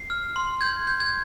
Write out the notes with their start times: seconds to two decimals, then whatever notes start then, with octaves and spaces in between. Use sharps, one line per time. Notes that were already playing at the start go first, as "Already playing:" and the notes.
Already playing: C7
0.10 F6
0.36 C6
0.61 G6 G#6
0.87 G6
1.00 G#6